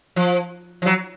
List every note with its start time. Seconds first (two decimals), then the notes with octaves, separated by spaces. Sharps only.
0.16 F3
0.82 F3
0.86 F#3